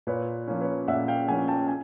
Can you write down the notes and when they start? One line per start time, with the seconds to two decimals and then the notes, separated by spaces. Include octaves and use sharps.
0.07 A#2 B4 C#5
0.48 F3 A#3 C#4
0.61 B4 C#5
0.88 A#2 E5 F#5
1.08 F5 G5
1.28 F3 A#3 C#4 F#5 G#5
1.48 G5 A5
1.68 G#5